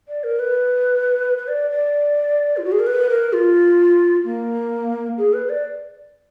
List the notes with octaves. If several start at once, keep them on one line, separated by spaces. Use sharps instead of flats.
D5
A#4
B4
B4
D5
D5
F4
F#4
G#4
A#4
B4
A#4
F4
A#3
G#4
B4
D5